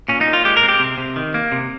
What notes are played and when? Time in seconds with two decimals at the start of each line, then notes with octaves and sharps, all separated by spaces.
0.08 A#2 C#4
0.21 D#4
0.27 A#2
0.33 F4
0.45 G#3 G4
0.57 A#4
0.62 C4
0.69 G4
0.80 C3
0.98 C3
1.16 D#3
1.34 A#3
1.52 C3